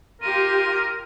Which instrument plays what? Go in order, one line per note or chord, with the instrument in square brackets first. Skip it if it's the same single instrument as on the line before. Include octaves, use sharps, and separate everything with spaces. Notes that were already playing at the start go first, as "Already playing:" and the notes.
[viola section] F4 G4 [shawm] A#4 [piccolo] D#7